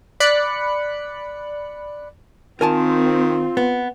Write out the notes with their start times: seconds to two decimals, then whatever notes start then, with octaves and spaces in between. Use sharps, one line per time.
0.20 D5 B5 F#6 C#7
2.61 D#3 C4 F4 A#4 G#5 A5
3.57 B3